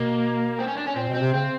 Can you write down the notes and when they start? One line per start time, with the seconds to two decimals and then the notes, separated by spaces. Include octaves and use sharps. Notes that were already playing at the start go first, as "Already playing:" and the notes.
Already playing: B2 A#3
0.59 C4
0.68 C#4
0.77 D4
0.87 C#4
0.96 A#2 C4
1.09 B2
1.14 C4
1.21 C3
1.34 C#3 C4